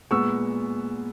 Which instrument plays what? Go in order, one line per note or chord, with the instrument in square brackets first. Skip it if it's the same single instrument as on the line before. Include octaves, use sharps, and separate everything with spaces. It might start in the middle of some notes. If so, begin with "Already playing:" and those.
[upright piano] A#2 G#3 B3 C#6 E6